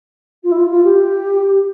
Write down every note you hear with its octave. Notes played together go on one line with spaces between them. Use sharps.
F4
E4
F4
F4
G4